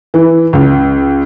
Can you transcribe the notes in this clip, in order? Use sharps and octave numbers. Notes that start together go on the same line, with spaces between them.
E3
C#2